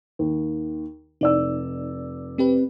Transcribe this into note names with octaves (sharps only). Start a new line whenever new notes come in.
D#2
F1 D#4 D5 E6
C4 G4 B4